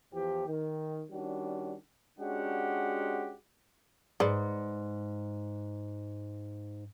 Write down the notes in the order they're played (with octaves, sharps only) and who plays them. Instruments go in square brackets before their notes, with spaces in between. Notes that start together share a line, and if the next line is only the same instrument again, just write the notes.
[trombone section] E2 E3 F3 G4
D#3
D#3 G3 C#4 D4 F#4
[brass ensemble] G#3 C#4 D4 F#4 G4 F#5
[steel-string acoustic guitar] G#2 [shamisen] G#4 B4 D5